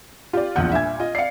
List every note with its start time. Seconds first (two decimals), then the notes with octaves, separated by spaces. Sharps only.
0.33 F4 G4 D5
0.56 A#1 E2 F4 F#5 F6 G6
0.72 G2 A#2 E5 G#5 G#6
1.00 F4 D#5
1.15 D5 F5 C7 C#7